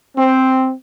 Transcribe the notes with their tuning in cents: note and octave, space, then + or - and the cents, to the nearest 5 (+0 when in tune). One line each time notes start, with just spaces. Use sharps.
C4 +0